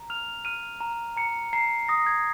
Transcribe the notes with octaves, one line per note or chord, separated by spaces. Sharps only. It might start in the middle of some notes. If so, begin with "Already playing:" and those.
Already playing: A#5
F6 F7
F6 D#7
A#5
A#5 C#7
A#5 C7
D#6 A#6
G#6